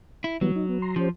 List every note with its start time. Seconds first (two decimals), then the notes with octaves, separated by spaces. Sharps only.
0.24 E4
0.41 E3 F#3 G3 B3
0.56 D#4
0.69 B3
0.82 A#5 C6
0.96 F3 C#4 G4 C5